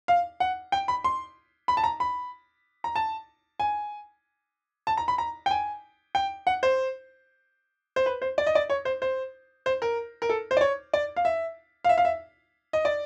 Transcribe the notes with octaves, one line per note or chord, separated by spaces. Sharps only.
F5
F#5
G5
B5
C6
B5
A5
A#5
B5
A#5
A5
G#5
A5
A#5
B5
A#5
G5
G#5
G5
F#5
C5
C5
B4
C5
D5
D#5
D5
C#5
C5
C5
C5
A#4
A#4
A4
C5
D5
C#5
D5
F5
E5
F5
E5
F5
E5
D#5
D5